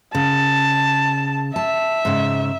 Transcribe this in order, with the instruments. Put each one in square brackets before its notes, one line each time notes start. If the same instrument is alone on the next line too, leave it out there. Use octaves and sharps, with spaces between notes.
[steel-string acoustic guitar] C#3 [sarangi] A5
[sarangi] E5 [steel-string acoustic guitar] A5
[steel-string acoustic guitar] G#2 C#3